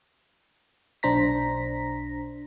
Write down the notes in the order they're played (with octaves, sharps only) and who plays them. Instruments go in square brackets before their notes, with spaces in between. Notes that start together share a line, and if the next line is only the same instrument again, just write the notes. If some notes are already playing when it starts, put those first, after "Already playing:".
[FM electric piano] B1 D4 C5 A#5 A#6 B6